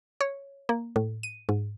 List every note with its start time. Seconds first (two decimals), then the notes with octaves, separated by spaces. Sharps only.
0.21 C#5
0.69 A#3
0.96 A2
1.23 D#7
1.49 G#2